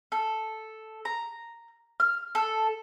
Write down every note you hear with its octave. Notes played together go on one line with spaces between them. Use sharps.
A4
A#5
F6
A4